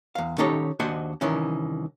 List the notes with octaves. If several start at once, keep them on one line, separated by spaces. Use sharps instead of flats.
E2 F5
D#3 C#4 D#4 G4 A4 C#5
D#2 D4 F#4 C5 D#5 G#5
C2 D#3 E3 C#4